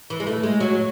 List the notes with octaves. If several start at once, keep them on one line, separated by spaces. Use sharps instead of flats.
E3
G#3
A3
G#3
F#3